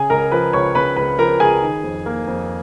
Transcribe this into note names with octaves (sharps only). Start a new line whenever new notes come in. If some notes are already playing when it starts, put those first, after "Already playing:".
Already playing: C#3 G#4 G#5
C#2 A#4 A#5
F3 B4 B5
C#2 C#5 C#6
C#3 B4 B5
C#2 B4 B5
F3 A#4 A#5
C#2 G#4 G#5
D#3
F2
A#3
F2